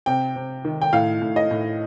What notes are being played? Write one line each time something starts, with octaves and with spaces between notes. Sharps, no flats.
C3 G5
C3
D#3
G5
A2 F5
A2
D#5
A2